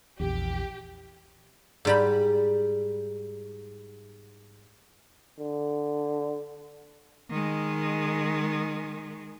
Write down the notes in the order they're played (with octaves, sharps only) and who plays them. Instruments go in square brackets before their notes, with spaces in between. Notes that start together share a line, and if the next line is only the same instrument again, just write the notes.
[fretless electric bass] A#1 E2 [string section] G4
[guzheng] G#2 G3 B5
[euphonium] D3
[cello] D#3 G#3